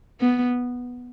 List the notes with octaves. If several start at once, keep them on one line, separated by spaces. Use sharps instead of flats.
B3